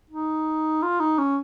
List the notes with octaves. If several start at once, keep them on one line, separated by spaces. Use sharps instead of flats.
D#4
F4
D#4
C#4